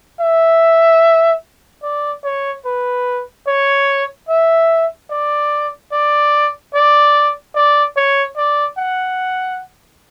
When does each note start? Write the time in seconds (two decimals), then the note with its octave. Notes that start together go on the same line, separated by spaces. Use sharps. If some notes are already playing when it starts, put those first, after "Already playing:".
0.20 E5
1.83 D5
2.24 C#5
2.66 B4
3.47 C#5
4.29 E5
5.11 D5
5.92 D5
6.74 D5
7.55 D5
7.97 C#5
8.37 D5
8.78 F#5